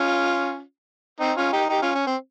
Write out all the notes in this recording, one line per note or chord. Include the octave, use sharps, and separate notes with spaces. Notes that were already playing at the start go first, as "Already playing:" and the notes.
Already playing: C#4 F4
C4 D#4
C#4 F4
D#4 G4
D#4 G4
C#4 F4
C#4
C4